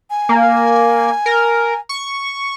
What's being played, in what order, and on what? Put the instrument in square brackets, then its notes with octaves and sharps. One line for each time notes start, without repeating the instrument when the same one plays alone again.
[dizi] G#5
[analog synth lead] A#3
A#4
C#6